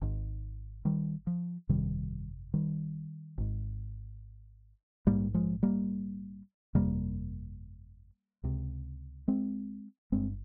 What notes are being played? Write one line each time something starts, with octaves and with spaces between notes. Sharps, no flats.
G#1 G#2
D#3 G3
F3
G1 F2 C3 D#3 G3
D#3 G3
G#1 G#2
A#1 G#2 G3 A#3
F3 G#3
G3 A#3
G1 F2 C3 G3 A#3
C#2 C3
G#3 C4
G1 G2 G#3 C4